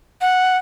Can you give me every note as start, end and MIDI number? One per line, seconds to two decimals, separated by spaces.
0.21 0.57 78